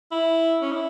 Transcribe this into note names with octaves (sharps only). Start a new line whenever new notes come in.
E4
C#4
E4